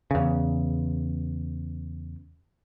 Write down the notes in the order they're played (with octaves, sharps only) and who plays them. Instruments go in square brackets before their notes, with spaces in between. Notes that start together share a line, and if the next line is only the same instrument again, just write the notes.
[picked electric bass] E2 C#3